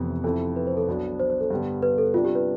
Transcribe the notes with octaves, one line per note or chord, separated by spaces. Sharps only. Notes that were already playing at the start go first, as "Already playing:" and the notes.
Already playing: F1 F2 C3 E3 B3 G4
F2 C3 F3 C4 E4 A4
B4
C5
A4
B1 B2 B3 D4
C5
C5
A4
G2 D3 G3 B3
B4
A4
C3 G3 D4 F4
G4
B4